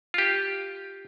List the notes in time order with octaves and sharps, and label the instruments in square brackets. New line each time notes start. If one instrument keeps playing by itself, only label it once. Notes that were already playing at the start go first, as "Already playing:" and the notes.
[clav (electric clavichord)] F4 G4